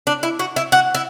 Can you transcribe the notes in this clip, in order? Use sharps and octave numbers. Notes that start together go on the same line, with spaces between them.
D4
E4
F#4
E4
F#4
E4